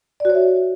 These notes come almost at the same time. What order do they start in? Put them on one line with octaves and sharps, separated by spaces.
D5 F#4 C#5 E5